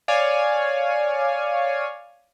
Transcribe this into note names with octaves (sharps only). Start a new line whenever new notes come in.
C#5 D5 F5 G#5